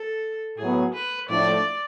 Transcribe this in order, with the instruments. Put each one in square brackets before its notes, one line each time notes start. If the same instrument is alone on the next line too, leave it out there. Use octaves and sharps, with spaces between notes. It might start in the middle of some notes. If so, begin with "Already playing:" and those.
Already playing: [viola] A4
[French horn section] A2 F#3 B3 [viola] G#4
[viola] B4
[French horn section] A2 F3 A3 D4 [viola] D5